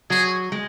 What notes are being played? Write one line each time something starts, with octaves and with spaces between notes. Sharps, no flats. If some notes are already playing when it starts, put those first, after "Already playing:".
F#3 G#4
G#3